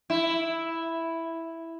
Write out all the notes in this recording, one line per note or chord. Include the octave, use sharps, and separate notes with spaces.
E4